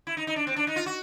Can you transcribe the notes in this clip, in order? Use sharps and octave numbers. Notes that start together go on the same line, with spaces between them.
E4
D#4
D#4
D4
C4
D4
D#4
F4
F#4